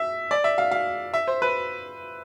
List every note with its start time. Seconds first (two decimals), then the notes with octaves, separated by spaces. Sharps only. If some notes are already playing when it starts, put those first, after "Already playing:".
Already playing: E5
0.31 D5
0.44 E5
0.58 F5
0.71 F5
1.14 E5
1.28 C5
1.42 B4